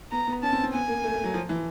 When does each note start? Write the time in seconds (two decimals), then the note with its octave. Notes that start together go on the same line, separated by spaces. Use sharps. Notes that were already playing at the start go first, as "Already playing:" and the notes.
0.12 B3 A#5
0.27 B3
0.43 C#4 A5
0.52 C4
0.63 C4
0.73 B3 G#5
0.88 A#3
1.04 A3
1.14 A3
1.24 F#3
1.34 F3
1.49 E3